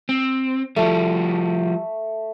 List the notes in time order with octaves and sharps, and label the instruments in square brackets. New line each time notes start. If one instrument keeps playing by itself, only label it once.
[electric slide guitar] C4
[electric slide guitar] F3 G3 [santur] A3